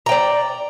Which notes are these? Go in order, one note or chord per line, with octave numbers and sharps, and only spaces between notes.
D5 G5 A#5